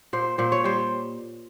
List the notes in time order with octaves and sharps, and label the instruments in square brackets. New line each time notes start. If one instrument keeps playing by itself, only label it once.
[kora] A#2 C5
A#2 C5
C#5
G3 C5